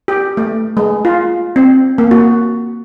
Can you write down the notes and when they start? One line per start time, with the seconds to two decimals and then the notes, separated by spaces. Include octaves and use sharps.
0.08 G4
0.37 A3
0.77 G#3
1.05 F4
1.56 C4
1.98 A#3
2.11 F#4